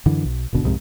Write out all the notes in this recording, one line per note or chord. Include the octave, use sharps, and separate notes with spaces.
F#2 D3 E3
B1
D#1 G#1 B2 D3
C2 F2 G#2 C3